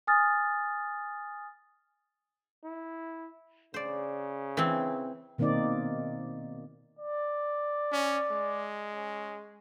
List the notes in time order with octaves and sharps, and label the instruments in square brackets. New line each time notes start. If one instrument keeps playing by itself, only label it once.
[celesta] G#5 D#6 F6 A6
[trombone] E4
[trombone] C#3 [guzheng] C5 D5
[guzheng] E3 C4
[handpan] B2 D#3 A#3 C4 D#4 D5
[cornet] D5
[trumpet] C#4
G#3
[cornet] C#4